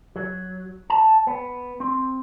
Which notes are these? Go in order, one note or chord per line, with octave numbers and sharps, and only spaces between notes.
F#3
A5
B3
C4